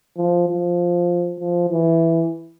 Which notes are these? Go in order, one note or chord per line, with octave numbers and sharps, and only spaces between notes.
F3
F3
F3
E3